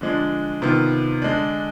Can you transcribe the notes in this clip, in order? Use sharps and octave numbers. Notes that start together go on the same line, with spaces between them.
D3 F3 G#3 D4
C3 D#3 B3 F4
D3 G#3 D4